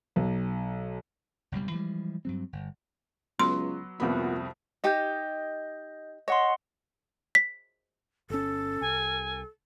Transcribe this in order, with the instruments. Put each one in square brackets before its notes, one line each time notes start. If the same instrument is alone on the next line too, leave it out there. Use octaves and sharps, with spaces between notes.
[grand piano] B1
[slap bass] F#1 B1 C3 G3
E3 F3 G3 G#3
G2 F#3 C4
G1
[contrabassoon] C#2 [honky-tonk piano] F#3 B3 [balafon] C6
[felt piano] C2 F2 B5 [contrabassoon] A#2 [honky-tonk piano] B3 F#4
[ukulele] D#4 G4 G5 [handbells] D#5 G6
[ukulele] C#5 [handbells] D#5 F#5 C6
[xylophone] B6
[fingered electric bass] G1 C#4 [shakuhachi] A4
[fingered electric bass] C2 [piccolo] G#5